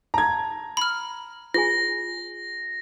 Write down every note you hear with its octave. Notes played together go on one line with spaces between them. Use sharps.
A5 A#5 G#6
B5 F6
F4 G#4 G#5 A#6